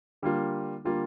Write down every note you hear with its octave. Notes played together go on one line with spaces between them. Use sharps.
D3 G3 A#3 F4
D3 G3 A#3 F4